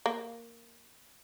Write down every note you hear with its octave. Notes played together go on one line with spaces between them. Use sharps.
A#3